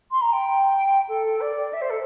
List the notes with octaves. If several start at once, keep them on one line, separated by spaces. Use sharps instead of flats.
C6
A#5
G5
A4
D5
E5
C5
A4